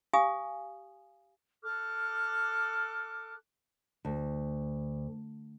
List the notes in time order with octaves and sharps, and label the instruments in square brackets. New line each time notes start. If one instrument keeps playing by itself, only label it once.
[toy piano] G4 F5 G#5 D#6
[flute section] A4 D6 F6 F#6
[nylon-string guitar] D2